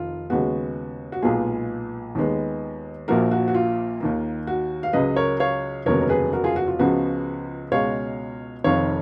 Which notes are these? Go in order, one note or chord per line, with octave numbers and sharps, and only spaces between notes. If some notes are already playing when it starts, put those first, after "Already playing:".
Already playing: F1 D#3 F4
D#2 C#3 G#3 B3 F#4
F#4
B1 A#2 G#3 B3 F4 G#4
D#2 D#3 G#3 B3
A#1 A#2 F3 A#3 F#4 A#4
F#4
F#4
F4
D#2 D#3 A#3
F#4
F5
C#2 C#3 F#3 B4 D#5
A#4 C#5
C#5 F5
F1 D#2 C#3 F#3 B3 A#4 C#5
A#4
G#4 B4
F#4 A#4
F4 G#4
F#4
F4
C#2 C#3 F3 B3 F#4
C#2 B2 G#3 C#5 F5
F1 F2 D#3 C#5 F5